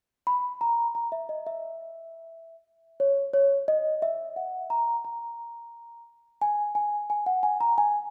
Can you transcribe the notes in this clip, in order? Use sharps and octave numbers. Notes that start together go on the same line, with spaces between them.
B5
A#5
A#5
E5
D#5
E5
C#5
C#5
D#5
E5
F#5
A#5
A#5
G#5
G#5
G#5
F#5
G#5
A#5
G#5